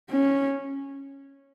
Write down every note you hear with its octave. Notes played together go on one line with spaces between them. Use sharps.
C#4